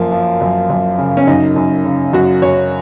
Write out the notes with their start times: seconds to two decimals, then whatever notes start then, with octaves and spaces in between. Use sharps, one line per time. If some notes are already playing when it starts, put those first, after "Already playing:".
Already playing: F#2 F3 A#3
0.12 F3
0.41 F#2
0.70 F#2
0.98 C#3
1.17 C#4
1.27 F#2 D#4
1.56 F#2
1.85 C#3
2.13 F#2 F#4
2.42 F#2 C#5